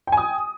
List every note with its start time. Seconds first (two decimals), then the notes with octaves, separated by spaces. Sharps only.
0.07 G5
0.12 G#5
0.17 D#6